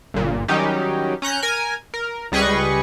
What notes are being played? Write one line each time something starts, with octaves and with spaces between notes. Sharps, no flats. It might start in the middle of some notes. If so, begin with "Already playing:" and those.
G1 A#2
D#3 F#3 G3 C#4 D#4 G4
C#4 A#5 F#6 G6
A#4 G#5
A#4
C#2 G3 G#4 B4 D#5 C#6